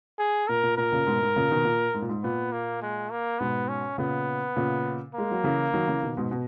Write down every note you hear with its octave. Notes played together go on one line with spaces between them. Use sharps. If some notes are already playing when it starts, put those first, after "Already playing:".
G#4
A#2 A#4
A#2
A#2 A#4
A#2 C#3
G#2 B2
G#2
A#2 C#3
B2 D#3
A#2
G#2
A#2
G#2
A#2 B3
A#3
G#3
A#3
G#2 B2 B3
C#4
A#2 C#3 B3
A#2 C#3
G#3 A#3
F#3
C#3 E3
D#3 F#3
C#3 E3
B2 D#3
G#2 B2
B2